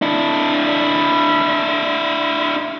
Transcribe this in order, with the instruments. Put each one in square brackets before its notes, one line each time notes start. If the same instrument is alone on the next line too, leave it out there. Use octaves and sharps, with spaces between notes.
[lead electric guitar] D4 E4